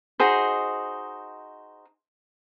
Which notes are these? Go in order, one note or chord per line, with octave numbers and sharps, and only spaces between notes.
D#4 F#4 G#4 C5